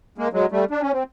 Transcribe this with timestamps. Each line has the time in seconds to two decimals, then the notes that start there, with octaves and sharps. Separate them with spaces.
0.18 G#3 A#3
0.33 F#3 G#3
0.52 G3 A3
0.71 D4
0.81 C#4
0.93 C4